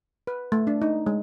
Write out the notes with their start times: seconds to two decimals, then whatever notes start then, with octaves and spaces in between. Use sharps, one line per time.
0.27 B4
0.52 A3
0.67 D4
0.82 D#4
1.06 G#3